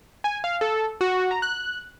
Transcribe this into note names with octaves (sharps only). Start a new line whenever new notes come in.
G#5
F5
A4
F#4
A#5
F#6